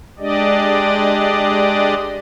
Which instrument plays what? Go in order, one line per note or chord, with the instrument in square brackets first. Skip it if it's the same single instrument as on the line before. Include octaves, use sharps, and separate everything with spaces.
[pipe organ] G#3 D4 G4 D5 D#5